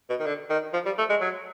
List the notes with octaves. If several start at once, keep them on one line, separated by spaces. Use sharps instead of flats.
B2
D#3
D3
D#3
F3
G3
A3
G#3
F#3